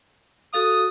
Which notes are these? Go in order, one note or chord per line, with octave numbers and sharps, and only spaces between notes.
F#4 A4 F5 D#6